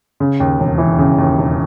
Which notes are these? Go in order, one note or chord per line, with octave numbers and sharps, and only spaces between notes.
C#3
D#2
E1
E3
C#3
D#2
E1